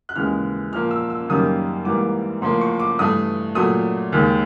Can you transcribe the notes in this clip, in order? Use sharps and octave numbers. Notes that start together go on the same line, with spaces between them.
F#6
D#2 C#3 E3 G#3 F6
A#2 F3 A#3 F6
E6
E6
F#2 D#3 G3 A#3 D#6
G#2 E3 G3 A#3 D6
A2 F3 A#3 C6
C#6
D6
G2 E3 A3 D#6
A#2 F#3 A3 D#6
D#2 D#3 G#3